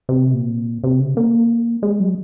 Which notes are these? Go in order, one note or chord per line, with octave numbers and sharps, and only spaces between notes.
C3
A#2
C3
C#3
A#3
G#3
F#3